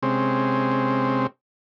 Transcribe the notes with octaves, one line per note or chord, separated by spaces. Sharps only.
C3 G#3 C4 C#4